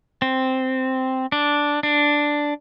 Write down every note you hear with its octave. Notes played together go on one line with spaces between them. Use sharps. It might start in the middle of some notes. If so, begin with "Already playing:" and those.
C4
D4
D4